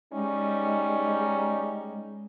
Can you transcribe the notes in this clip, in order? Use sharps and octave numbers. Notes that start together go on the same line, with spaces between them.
G3 G#3 C#4 D#4